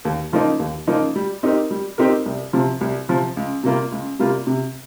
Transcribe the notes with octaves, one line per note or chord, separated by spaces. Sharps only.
D#2
C#3 F3 A#3 D#4
D#2
C#3 F3 A#3 D#4
G3
C4 D#4 G4 A#4
G3
C4 D#4 G4 A#4
C2
C3 F3
C2
C3 F3
C#2
C3 G3 A#3 F4
C#2
C3 G3 A#3 F4
C3